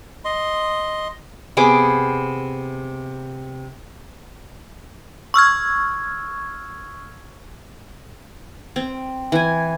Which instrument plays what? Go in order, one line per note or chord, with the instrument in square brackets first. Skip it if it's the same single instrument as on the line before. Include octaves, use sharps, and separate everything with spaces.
[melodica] D#5 C6
[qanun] C3 B3 G#4 D6
[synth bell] C#6 E6 F6 G#6
[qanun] C4
E3 G#5